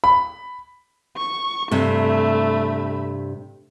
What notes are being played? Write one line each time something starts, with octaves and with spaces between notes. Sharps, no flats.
B5
C#6
G2 C3 A3 B5